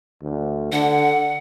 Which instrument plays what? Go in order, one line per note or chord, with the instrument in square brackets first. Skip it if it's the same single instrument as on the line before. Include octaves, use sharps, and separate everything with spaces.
[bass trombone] D2
[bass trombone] D3 [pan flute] F#5